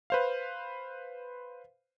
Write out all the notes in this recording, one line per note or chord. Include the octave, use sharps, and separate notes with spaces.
B4 C5 F5